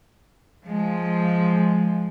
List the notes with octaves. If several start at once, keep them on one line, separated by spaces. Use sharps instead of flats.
F3 G#3